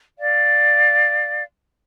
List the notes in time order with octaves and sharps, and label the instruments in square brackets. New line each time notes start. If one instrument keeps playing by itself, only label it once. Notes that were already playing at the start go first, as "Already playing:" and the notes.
[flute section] D5 F5